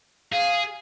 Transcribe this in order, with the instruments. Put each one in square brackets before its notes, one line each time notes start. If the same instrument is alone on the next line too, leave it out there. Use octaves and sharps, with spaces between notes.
[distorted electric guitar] G#4 [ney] F5